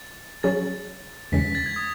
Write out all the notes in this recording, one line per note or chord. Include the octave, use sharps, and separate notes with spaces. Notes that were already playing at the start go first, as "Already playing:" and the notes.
Already playing: A6
F#3 C#4 G#4 C#5 A6
E2 C#3 E3 G#3 C#4 B6
B6
A6
G#6
D#6